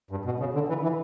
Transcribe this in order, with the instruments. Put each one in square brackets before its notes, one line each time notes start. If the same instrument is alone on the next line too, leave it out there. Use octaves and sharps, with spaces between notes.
[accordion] G2
B2
C#3
D3
E3
E3